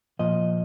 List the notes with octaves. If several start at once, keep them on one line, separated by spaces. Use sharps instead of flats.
A#2 F3 D#5